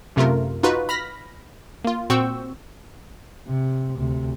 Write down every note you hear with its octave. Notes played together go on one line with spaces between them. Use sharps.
F#2 C3 A3 F4 A#4
D#4 F4 F#4 B4
B5 F6 A#6 B6
A#3 F4
A#2 C4 F#4 C#6 E6 G6
C3
D2 C3